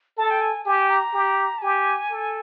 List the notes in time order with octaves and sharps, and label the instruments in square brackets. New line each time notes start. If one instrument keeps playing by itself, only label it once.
[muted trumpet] A4 [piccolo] A5
[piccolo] G5
G#5
[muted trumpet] G4 [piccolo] G#5
[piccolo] A#5
[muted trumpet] G4
[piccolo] A5
[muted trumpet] G4 [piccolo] G#5
[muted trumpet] A4